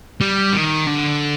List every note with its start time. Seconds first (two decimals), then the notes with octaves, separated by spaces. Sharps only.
0.21 G3
0.54 D#3
0.88 D3